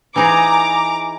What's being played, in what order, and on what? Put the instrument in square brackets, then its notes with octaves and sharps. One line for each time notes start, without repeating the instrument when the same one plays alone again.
[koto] E3 D#4 G#4 [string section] A#5 D6